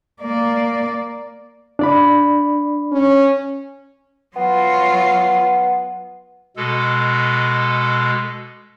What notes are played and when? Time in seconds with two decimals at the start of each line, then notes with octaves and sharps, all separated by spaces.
0.22 A#3 D5
1.79 D4 D5 B5
2.92 C#4
4.36 F#3 B3 F4
6.57 B2 G#3 A4